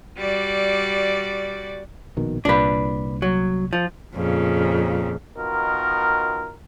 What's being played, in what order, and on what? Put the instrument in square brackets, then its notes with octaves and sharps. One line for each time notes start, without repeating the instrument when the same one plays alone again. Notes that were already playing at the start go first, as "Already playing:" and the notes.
[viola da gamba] G3 F#4 D5
[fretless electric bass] A#1 B2 D#3
[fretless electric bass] C2 A#2 [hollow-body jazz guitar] D4 B4
[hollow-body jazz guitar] F#3
F3
[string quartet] F2 A#2 C#3
[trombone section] B2 D#3 F4 A#4